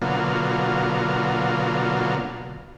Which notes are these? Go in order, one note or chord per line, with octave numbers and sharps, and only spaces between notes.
B2 D3 F#3 A#3 F4